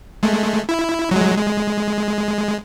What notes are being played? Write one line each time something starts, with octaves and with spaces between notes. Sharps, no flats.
G#3 A3
E4
F#3 G#3
G#3